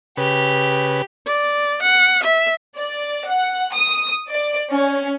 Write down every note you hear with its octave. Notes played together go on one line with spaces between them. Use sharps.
C#3 G4 B4
D5
F#5
E5
D5
F#5
D#6
D5
C#4